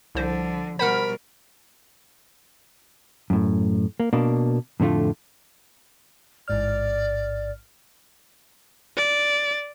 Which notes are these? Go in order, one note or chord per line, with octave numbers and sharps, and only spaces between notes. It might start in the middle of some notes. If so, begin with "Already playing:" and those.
C2 D3 F3 C5
B2 G3 A#4 C5 F#5 B5 F6
F#2 A2
A#3
B2 A#3 D4
F2 A2 D3 A3 F4
A1 G#2 D5 F6
D5